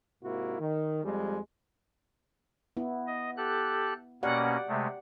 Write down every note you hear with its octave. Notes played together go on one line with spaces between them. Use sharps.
G#2 C3 A#3 E4 F#4
D#3
F2 G3 G#3
B3 E4
D#5
G4 A4 F#6
B2 A#3 C#4 G4 D5 F#5
C3 G#3 A3